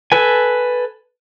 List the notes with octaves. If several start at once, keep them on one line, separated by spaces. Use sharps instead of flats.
A4 B4 G#5